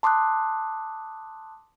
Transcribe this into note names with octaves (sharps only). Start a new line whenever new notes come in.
A5 C6 D6 D#6 F#6